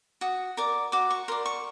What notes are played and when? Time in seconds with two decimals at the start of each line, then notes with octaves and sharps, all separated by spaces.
0.21 F#4 D#6
0.57 A#4 D5 D6
0.92 F#4 D6
1.11 C#6
1.28 A#4 D5 C6
1.46 C#6